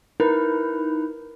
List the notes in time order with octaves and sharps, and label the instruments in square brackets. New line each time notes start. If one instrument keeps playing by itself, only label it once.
[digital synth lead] D#4 [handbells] E4 B4 [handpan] A#4